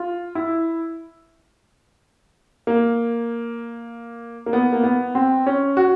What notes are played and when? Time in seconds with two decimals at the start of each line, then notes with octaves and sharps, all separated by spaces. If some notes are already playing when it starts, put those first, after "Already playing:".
Already playing: F4
0.35 E4
2.67 A#3
4.46 A#3
4.53 B3
4.72 A#3
4.84 B3
5.15 C4
5.46 C#4
5.77 F#4